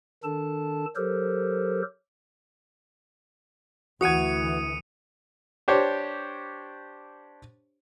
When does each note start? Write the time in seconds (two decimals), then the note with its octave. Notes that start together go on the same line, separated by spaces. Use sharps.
0.24 D#3 D4 A4 A5
0.96 F#3 G4 A4 A#4 C5
4.01 D2 E3 F#4 F#5 D#6 G#6 C#7 D#7
5.68 D4 G4 C5 C#5